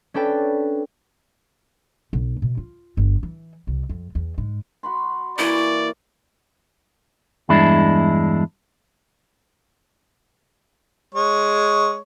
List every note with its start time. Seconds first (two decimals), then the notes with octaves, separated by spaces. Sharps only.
0.14 C#4 D4 A4 B4 G5 A5
2.13 B1
2.42 B2
2.57 F4
2.97 G1
3.23 E3
3.67 C2
3.89 F2
4.15 E2
4.38 G#2
4.83 F#4 B5 C6
5.39 E3 A#3 E4 D5 C#6
7.49 E2 G2 G#3 D4 E4
11.15 G#3 C#5